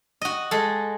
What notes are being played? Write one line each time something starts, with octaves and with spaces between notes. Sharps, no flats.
F#4 D#5
G#3 A4